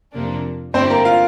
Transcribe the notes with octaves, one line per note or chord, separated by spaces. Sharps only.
F2 C3 F3 A#3 D4
G2 D3 A3 C4 E4 G4 C5
A#3 A#4
F4 F5